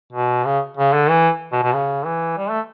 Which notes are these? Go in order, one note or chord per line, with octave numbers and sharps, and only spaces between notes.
B2
C#3
C#3
D3
E3
B2
B2
C#3
E3
G3
A3